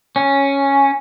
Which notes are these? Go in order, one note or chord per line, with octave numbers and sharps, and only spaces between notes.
C#4